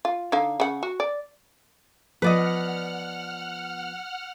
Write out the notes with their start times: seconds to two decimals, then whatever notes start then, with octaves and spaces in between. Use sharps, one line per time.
0.05 F4
0.32 D3 D#4 F5
0.60 C#3 F#5
0.83 F#4
1.00 D5
2.22 F3 B3 B4 D5 D#5 F#5 F6